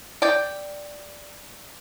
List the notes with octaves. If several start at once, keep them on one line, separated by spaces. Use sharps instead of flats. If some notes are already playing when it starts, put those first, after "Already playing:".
D5 G5